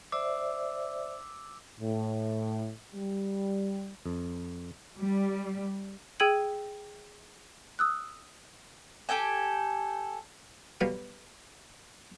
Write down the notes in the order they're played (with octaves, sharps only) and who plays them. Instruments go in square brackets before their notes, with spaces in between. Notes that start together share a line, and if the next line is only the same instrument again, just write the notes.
[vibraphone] C5 D5 E5 [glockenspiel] D6 E6
[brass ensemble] A2
G3
[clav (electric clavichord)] F2
[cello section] G3
[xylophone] G#4 G5 E6 G#6 D#7 F#7
D#6 E6 F#6
[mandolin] G4 A4 G5 G#5
[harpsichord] B1 B2 G3 F5 D6